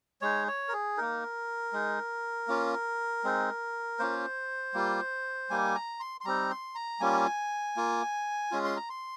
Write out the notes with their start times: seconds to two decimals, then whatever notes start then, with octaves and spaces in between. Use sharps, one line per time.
0.21 G#3 D#4 C#5
0.48 C#5
0.68 A#4
0.73 G#4
0.97 A#3 D#4 A#4
1.73 G#3 D#4
2.48 A#3 C#4 F4
3.24 G#3 C4 D#4
3.99 A#3 C#4 F4 C5
4.74 G3 A#3 F4
5.50 G3 A#3 D#4 G#5
5.75 A#5
6.00 C6
6.21 C6
6.25 G3 C4 D#4 A#5
6.50 C6
6.75 A#5
7.00 G3 A#3 C#4 F4 G#5
7.76 A#3 F4
8.51 G#3 C#4 F4
8.64 C6
8.76 A#5
8.89 C6